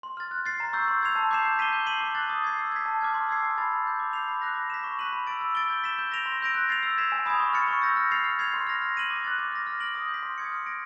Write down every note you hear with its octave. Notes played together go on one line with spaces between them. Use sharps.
C6
F6 A6
F#6
A6 C7
A#5
C#6 E6 G6
C6
E6 G#6 C7 F7
A5
D6 G6 C7 E7
G6
B6 D#7 G7
G6
C7 D#7 F#7
D6
F#6 A6
D#6
G#6 C7
E6
G#6 B6
A5
D6 F6 G#6
C6
E6 G#6 C7
G#5
B5 E6 A6
B5
D6 G6
D6
G6 C7 F7
B5
D6 F#6 A#6
F#6
B6 E7
C#6
F#6 B6 D#7 F#7
B5
E6 A6 D7
E6
A6 D7 G7
G6
B6 E7 G7
G6
A#6 D7 F7
C6
E6 G6 A#6 D7
F#6
A6 C7 F7
E6
G#6 B6 E7
G#5
B5 D#6 G#6
C#6
F6 A6 C#7
C#6
E6 G6 A#6
F6
A6 C7 F7
F6
G#6 C7 F7
C6
F6 A#6
F6
A#6 D#7 F#7
D6
F#6 A6
D6
F6 A#6
F6
A#6 D7 F#7
D#6
G6
B6
C6
D#6 G#6 C#7
F6
A#6 D7